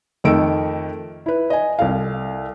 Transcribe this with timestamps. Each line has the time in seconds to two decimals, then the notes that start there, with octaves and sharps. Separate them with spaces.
0.24 F2 D#3 A3 E6 D7
1.26 E4 B4
1.50 D#5 G#5
1.79 C2 A4 F5